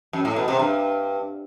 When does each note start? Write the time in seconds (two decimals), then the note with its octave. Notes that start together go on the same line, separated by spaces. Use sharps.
0.13 F#2
0.25 A2
0.36 B2
0.48 C3
0.59 G2